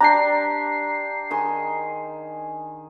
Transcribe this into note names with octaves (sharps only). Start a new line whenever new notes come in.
D4 G4 A#5 C6 C7
D#3 G#4 C6